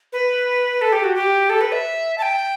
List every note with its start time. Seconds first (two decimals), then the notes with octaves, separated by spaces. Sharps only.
0.13 B4
0.81 A4
0.92 G4
1.04 F#4
1.15 G4
1.50 A4
1.61 B4
1.72 E5
2.18 A5
2.22 G5